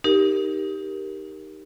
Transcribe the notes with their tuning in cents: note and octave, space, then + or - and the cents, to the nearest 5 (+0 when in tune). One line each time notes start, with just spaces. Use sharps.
D#4 +0 G4 +0 A#4 +0